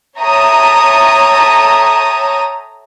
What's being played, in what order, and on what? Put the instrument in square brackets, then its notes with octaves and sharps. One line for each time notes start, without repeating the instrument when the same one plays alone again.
[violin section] A4 C#5 E5 G5 A#5 D#6